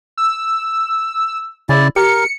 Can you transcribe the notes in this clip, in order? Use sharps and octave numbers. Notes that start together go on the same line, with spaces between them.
E6
C#3 E4 D5
G4 A#4 C#7